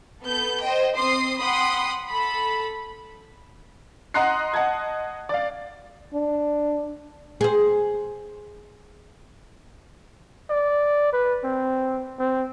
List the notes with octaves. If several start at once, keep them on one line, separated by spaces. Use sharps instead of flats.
B3 A4 G6
C5 D#5 G5
C4 C6 D#6 C7
F#5 G5 B5 C6 D#6
A4 B5
D#5 F#5 A#5 C6 F#6 C7
D#5 F#5 A5 G#6
D5 F5
D4
G#4 C5
D5
B4
C4
C4